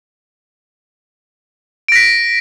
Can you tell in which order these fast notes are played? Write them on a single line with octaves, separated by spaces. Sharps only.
D7 A#6 B6